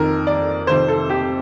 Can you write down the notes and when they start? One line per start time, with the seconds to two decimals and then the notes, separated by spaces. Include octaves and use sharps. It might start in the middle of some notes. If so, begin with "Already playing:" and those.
Already playing: F2 D#3 A#4
0.27 D5
0.67 F2 C3 D#3 C5
0.88 A4
1.10 G4